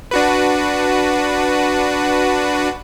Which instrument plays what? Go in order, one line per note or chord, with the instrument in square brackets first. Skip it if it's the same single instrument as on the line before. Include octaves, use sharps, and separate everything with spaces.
[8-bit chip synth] D4 F#4 B4